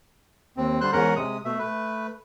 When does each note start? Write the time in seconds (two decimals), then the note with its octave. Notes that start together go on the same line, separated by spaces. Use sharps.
0.57 D#2 C4
0.81 D3 G3 C5 C6 F#6
0.93 E2 G#2 C#4 A#4 F#5 A#5
1.16 C3 G#3 D#6
1.45 B2 A3 E5
1.59 A3 B4